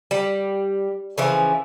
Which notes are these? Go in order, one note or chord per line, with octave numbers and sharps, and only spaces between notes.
G3
C#3 E3 F3